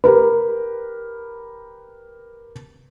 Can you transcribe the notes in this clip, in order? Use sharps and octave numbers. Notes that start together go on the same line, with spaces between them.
G4 A#4 B4